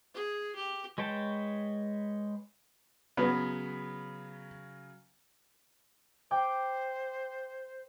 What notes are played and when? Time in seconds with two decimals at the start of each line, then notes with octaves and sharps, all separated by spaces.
0.14 G#4
0.55 G4
0.98 G#3 B4 C#5 G5 A5
3.17 C#3 F#3 B3
6.31 C5 G5 D6